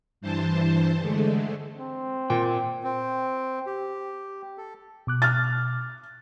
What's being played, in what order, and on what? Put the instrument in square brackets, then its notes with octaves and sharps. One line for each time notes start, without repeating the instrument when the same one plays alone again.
[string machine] G2 E3 C5 A5
D3 G#3 A3
[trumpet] C4
[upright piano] A#2 [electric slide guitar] G5
[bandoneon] C4
G4
A4
[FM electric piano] B2 D6 F#6
[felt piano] F6 A6